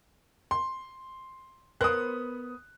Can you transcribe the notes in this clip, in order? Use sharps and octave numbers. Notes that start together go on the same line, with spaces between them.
C6
B3 A#4 C5 D#6 F#6